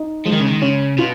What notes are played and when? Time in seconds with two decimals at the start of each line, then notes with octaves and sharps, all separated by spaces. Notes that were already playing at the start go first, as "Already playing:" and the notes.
Already playing: D#4
0.26 F3 G#3
0.33 D#3
0.40 C#3
0.47 D#3
0.62 C#3 C#4
0.98 B2 F4